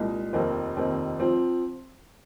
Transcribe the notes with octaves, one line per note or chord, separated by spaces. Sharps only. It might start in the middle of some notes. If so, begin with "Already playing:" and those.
Already playing: C2 A#2 G#3 D#4
F1 D#2 D#3 C4 D#4
F1 D#2 D#3 C4 D#4
F3 C4